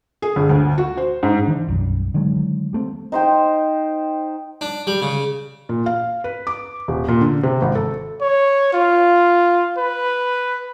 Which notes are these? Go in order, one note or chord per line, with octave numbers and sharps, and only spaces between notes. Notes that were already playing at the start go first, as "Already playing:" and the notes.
G#4
G1
D2
F#4
C5
G#2
D#3 E3 A#3 D4
B1 F#2 G3
D3 D#3 F#3 G#3
G3 A3 C4
D#4 C5 G5
D4
G3
C#3
A#2
F5
B4
D6
D#1
A#2
D3
C3
G#1
A4
C#5
F4
B4